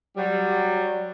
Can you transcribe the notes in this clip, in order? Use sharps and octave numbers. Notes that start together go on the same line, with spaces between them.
F#3 G3